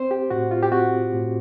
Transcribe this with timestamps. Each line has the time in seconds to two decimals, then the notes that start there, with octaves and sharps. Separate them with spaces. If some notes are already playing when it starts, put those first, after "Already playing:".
Already playing: C4 C5
0.11 G4
0.30 A2 F#4
0.51 F4
0.63 G4
0.72 C4 F#4
1.13 A2